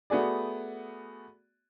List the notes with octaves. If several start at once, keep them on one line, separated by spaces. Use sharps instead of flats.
A3 B3 F#4 G#4 D5